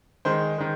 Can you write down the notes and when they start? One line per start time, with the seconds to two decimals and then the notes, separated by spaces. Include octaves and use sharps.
0.25 D#3 G#3 C5
0.58 D#3 G#3